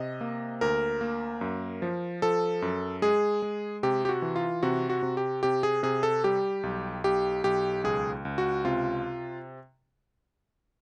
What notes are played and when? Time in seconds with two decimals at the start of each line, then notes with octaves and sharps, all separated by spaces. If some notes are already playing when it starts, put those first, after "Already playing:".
Already playing: C3 D#5
0.21 A#3
0.61 D2 A#4
1.01 A#3
1.41 F#2
1.82 F3
2.22 F3 A4
2.62 F#2
3.02 G#3 G#4
3.42 G#3
3.83 C3 G4
4.05 G4
4.09 F#4
4.22 E3
4.36 F4
4.63 C3 F#4
4.90 F#4
5.03 C3
5.17 G4
5.43 C3 G4
5.63 G#4
5.83 C3 G#4
6.03 A4
6.24 G3 G4
6.63 B1
7.04 B1 G4
7.44 B1 G4
7.84 C#2 G#4
8.25 C#2
8.38 F#4
8.65 C3 F4